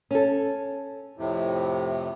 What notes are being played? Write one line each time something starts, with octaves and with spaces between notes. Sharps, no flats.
C#4 A4
F2 A2 C3